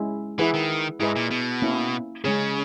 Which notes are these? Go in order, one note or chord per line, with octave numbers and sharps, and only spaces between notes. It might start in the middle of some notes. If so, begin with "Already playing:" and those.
Already playing: G#3 C#4 E4
E3 E4 G#4 B4 F#5
D#3
G#2 E4 G#4 B4 D#5
A#2
B2
A#3 C#4 E4
C#3 G#3 C#4 G#4